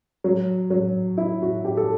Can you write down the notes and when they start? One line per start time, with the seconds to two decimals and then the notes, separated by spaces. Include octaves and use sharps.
0.24 F#3
0.70 F#3
1.18 E4
1.42 F#4
1.65 G4
1.77 A4